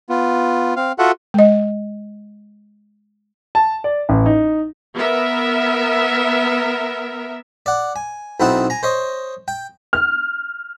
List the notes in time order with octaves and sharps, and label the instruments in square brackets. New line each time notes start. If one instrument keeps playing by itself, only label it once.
[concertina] B3 F4
C4 F5
F4 F#4 A4 E5 F#5
[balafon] G#3 D#5
[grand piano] A5
D5
A1
D#4
[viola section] B3 A#4 E5
[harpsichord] D5 F#5
G#5
B1 C4 D#4 E4 F#5 A5
G#5 A#5
C5 C#5 D#5
G5
[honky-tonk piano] F6